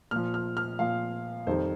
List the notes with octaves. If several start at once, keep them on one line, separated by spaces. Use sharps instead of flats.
A#2 F3 F6
F6
F6
A#2 F3 F5
F2 D#3 G3 C5